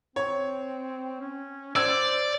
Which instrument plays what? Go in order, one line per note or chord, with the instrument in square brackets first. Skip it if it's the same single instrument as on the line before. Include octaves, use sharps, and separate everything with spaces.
[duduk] C4 [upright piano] C#5
[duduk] C#4
[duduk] C5 [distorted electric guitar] D5 [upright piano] E6 G#6